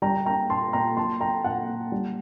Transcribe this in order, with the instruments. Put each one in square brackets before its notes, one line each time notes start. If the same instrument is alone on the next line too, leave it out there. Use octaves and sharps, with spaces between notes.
[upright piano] G3 G5 A#5
A#3 G5 A#5
A#2 A5 C6
A#2 G5 A#5
F#3 A5 C6
A#3 G5 A#5
A#2 F#5 A5
A#2
G3